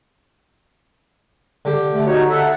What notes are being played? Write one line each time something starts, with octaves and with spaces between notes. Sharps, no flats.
D3 G4
A3
D#4 F#4 C#5
A4 E5 F#5